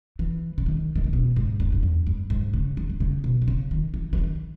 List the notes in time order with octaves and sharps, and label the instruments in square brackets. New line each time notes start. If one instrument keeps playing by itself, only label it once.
[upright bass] E3
C#3
D#3
D#3
C#3
B2
G#2
G2
G2
E2
G2
G#2
C#3
D#3
D#3
C#3
B2
D#3
C#3
D#3
E3
E3
D#3